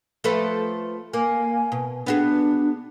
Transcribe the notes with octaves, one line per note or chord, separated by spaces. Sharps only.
F3 A3 B4
A#3 G#5
B2
B3 D4 F#4 G#4